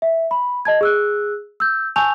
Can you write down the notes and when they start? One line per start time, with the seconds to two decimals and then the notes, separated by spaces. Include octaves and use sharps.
0.02 E5
0.31 B5
0.65 D#5 A5 G#6
0.81 G#4 E6 F#6
1.60 E6 G6
1.96 G#5 A5 C#6 E6 G6 F7